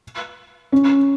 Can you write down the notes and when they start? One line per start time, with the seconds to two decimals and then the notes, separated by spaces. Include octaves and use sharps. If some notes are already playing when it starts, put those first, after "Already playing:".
0.72 C#4